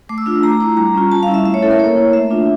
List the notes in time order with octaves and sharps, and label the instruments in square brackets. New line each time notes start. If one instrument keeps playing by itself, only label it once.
[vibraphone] A3 D6
E6
D4 F4 D6
A3 A#5
E4 D6
G3 A#5
C#4 F4
G3 A5
F5
C#4 E4
E5
A3 E5
C#5
C#4 E4 A4
A#4
A#3 C#5
E4
A3 E5
D4 F4